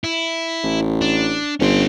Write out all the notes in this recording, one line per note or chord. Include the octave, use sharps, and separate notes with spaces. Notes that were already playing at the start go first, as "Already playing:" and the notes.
E4
A1
D4
G1 C#4 C6